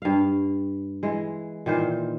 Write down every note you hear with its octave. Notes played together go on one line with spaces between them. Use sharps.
G2 F5
E3 G#3
A#2 D#3 E3 C5